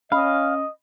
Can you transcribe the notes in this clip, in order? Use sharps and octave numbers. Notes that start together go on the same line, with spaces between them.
C#4 D#5 F5 B5